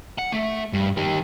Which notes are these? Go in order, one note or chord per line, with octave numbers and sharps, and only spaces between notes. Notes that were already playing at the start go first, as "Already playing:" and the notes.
F#5
A3
G2
D#3 G4